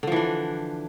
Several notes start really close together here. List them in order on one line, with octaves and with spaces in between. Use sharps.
D3 F3 E3 D4